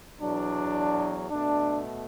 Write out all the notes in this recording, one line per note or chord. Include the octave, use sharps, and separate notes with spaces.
E2 B2 F#3 D4
B2 A3 D4